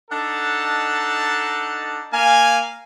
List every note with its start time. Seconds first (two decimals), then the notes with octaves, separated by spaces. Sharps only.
0.11 D4 D#4 A4 F#5 A5
2.13 A#3 F5 G#5